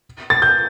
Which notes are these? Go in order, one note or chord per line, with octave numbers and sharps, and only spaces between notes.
A6
G6